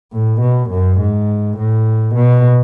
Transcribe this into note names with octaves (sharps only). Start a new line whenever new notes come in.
A2
B2
F#2
G#2
A2
B2